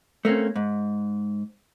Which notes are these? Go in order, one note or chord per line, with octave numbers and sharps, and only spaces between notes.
A3 A#3 C4 C#4
G#2